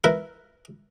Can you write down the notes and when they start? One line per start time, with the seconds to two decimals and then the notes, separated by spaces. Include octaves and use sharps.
0.04 E4 A#4 B4